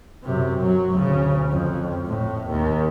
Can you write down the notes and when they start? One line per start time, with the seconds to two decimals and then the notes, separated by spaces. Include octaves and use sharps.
0.24 F#2 C3
0.60 F#3
0.92 D2 C#3
1.49 F2
2.07 A2
2.47 D#2